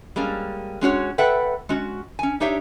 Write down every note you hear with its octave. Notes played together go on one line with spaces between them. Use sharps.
G3 G#3 A#3 C#4
G#3 C#4 F#4 C#5
A4 B4 E5 F#5 G5
G#3 C#4 F#4
C#4 G#5
D4 D#4 G4 C#5 E5